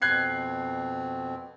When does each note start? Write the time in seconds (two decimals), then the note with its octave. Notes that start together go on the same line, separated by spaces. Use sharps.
0.02 F2 B2 C4 F#6 G#6 C7